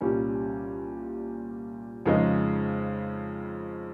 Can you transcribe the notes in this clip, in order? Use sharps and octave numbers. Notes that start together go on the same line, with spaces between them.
C2 A#2 G3 C#4
F2 C#3 G#3 D#4